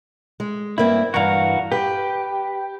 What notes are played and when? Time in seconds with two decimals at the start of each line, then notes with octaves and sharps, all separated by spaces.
0.40 G#3
0.78 G2 A#3 C4 E4
1.14 G2 E3 F#4 A#4 F5
1.72 G4 B4